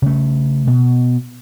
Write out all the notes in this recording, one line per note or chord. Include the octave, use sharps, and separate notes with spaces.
C#3 A3
B2